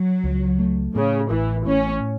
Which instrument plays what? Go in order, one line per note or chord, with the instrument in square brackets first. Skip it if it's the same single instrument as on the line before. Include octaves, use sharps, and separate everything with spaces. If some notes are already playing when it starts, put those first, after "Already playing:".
Already playing: [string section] F#3
[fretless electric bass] C#2
A3
[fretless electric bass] A2 [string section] C#3
[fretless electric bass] A1 [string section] E3
[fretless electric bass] A2 [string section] C#4